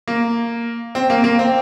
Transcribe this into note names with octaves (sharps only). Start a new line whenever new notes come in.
A#3
C4
A#3
A#3
C4